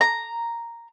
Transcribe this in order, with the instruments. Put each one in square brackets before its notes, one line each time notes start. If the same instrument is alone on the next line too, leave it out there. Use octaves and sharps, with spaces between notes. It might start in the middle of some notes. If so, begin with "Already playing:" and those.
[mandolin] A#5